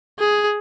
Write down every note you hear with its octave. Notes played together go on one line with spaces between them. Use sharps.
G#4